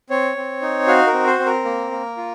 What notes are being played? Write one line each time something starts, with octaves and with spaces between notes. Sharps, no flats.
C4 C#5
C4
D#4
F#4 F5
A#4
C4
C5
C4
A#4
A#3
A#3
F4